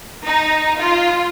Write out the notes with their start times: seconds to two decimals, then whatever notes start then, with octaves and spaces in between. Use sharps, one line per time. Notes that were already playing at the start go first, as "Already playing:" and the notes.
0.24 D#4
0.78 F4